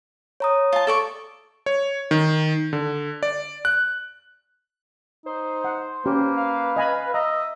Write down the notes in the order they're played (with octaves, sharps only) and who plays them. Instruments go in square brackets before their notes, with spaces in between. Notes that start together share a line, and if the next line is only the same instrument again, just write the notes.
[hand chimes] C#5 A#5 D#6
[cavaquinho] F4 A5
A4 D5 C#6
[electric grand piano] C#5
D#3
D3
D5
F#6
[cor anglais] D#4 [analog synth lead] C5
[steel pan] F#5
[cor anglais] A#3 [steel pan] C#4 G4 [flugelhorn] B4
[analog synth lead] F5
[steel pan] D#5 G#5 B5
[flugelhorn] D#5 [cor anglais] E5 [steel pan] A#5